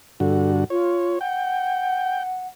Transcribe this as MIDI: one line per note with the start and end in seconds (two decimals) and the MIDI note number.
0.20 0.64 43
0.20 0.64 50
0.20 0.64 66
0.20 0.51 69
0.70 1.18 65
0.70 1.19 73
1.21 2.47 78
1.21 2.23 79